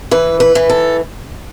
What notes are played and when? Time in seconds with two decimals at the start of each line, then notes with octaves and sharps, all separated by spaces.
0.11 E3 B4
0.40 B4
0.55 E3
0.70 A4